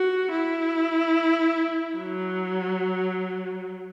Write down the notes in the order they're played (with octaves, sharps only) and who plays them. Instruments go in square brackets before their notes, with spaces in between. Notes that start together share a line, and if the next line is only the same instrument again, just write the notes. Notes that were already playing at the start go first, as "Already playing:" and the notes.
Already playing: [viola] F#4
E4
F#3